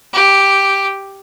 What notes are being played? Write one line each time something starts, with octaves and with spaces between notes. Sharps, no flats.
G4